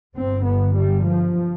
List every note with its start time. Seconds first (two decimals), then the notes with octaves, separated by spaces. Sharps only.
0.17 G1 G2 C4
0.47 B3
0.77 G3
1.07 F3